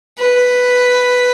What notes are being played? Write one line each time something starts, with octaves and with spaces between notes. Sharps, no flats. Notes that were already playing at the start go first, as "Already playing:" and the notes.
B4